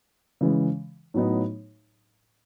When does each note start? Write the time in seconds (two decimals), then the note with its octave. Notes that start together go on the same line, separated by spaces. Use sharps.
0.41 C#3 E3 G#3
1.14 A2 F#3 B3 D#4